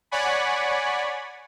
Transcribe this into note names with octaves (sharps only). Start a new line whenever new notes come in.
C#5 D5 F#5 G#5 B5